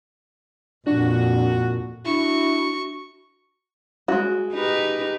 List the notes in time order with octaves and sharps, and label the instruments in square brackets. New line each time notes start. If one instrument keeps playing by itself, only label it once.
[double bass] F2 A#2 [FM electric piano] D4 [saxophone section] F#4
[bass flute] D4 [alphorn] E4 [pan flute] F#4 [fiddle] C#6
[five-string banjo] G#3 F#4
[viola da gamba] D#4 G4 B4